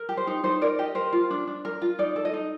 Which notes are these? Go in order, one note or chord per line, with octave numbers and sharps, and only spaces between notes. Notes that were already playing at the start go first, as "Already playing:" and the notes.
Already playing: A#4
G4
C5
D#4
D#4 C5
A#4 D5
G4 D#5
A#4 C5
F4
D4
D4
A#4
F4
D#4 D5
A4
D#5
D#4